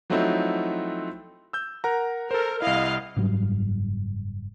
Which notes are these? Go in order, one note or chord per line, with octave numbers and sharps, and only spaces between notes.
F3 F#3 A3 C4 D#4 E4
E6 G6
A#4 F#5 A#5
A4 A#4 C5
C2 E4 D#5 F5
F#1 G#2 F#3 G3